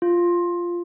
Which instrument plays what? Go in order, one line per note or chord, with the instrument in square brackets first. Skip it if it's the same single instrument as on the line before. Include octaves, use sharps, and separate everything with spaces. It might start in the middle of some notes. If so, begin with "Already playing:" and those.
[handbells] F4